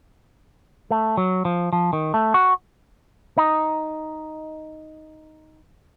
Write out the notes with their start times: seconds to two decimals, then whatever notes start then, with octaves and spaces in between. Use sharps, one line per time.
0.91 A3
1.17 F#3
1.45 F3
1.73 F3
1.93 D#3
2.14 A3
2.34 F#4
3.38 D#4